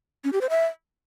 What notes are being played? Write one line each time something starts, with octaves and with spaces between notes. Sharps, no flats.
C#4
G4
C5
E5